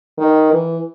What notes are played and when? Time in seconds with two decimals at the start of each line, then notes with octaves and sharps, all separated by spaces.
0.18 D#3
0.53 E3